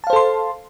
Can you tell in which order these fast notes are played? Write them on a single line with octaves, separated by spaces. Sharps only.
A5 F5 C5 A4 C6